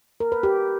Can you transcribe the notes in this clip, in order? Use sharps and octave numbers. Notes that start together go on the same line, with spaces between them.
A#4
B4
G4